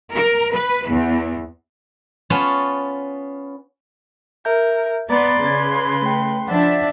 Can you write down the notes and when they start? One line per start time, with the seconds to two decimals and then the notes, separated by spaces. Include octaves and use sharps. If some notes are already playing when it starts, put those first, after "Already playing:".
0.14 A#4
0.53 B4
0.88 E2
2.30 B3 C#4 F4 C#5 A5
4.45 A#4 E5 G6
5.10 B3 B4 D5 A#5 C6
5.43 C#3 D6 G#6
6.02 A3 G5
6.48 F3 D4 D5 E5 F#5